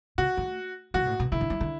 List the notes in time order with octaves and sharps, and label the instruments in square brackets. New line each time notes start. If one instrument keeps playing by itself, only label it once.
[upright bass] C#3 [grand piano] F#4
[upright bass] A3
[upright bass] F#3 [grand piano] F#4
[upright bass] B2
A2
B2
[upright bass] C#3 [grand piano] E4
[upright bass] D3
F#3
D3